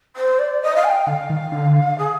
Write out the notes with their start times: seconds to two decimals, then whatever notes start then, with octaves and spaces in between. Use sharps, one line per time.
0.16 C5
0.39 D5
0.61 D#5
0.75 F5
0.84 G#5
0.88 G5
1.07 D3 F5
1.30 D#3
1.52 D3
1.98 G#4